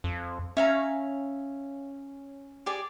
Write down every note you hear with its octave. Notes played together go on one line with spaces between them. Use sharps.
F2
C#4 E5 F5 A#5
G4 G#4 D5